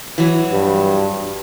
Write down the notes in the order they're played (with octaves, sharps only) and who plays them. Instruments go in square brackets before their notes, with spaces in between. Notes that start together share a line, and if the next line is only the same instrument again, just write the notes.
[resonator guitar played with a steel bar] E3 F#3
[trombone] G2